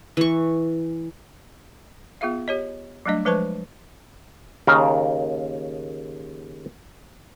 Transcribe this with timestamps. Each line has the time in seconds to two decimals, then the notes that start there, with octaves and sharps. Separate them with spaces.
0.17 E3 C#6
2.21 B3 F4 G#4 E5 F5
2.48 G4 C#5 D#5
3.06 F#3 G3 A3 D4 D#5
3.25 F3 G#3 B4 C5 A5 C#6
4.67 D#2 C#3 A#4 F5